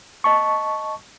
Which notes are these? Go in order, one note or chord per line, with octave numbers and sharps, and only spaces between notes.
D#5 A5 C#6